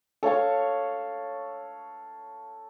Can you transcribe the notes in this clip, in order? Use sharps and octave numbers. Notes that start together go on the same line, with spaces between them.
A4 C#5 F5 C#6